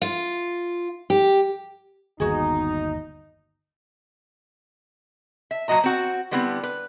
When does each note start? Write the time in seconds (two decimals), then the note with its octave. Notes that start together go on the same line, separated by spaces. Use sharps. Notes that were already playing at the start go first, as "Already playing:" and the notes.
0.02 F4
1.10 G4
2.20 G1 D#2 B3 D#4 F#4 G#4
5.51 E5
5.68 A#2 F#3 F#4 D#5 A#5
5.84 C4 F#4
6.31 D3 G3 B3 C4 E4
6.63 B4